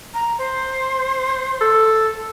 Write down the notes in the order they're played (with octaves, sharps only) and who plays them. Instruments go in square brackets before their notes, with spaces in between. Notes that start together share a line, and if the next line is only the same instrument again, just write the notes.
[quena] A#5
C5
[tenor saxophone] A4